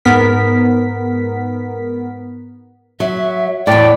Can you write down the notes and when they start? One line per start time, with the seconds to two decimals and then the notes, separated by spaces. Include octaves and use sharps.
0.05 G#2 B3 A#4 B6
3.00 F#3 E5
3.67 E2 A2 D5 G5